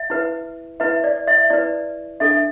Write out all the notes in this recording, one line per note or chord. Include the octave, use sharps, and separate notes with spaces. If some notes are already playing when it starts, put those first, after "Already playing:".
Already playing: E5
E4 B4
E4 B4 E5
D5
E5
E4 B4 D5
D4 A4 E5